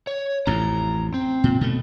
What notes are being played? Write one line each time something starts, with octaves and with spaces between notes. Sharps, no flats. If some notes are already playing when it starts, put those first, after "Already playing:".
C#5
A1 F2 A2 A#5
C4
A#2
B2 A3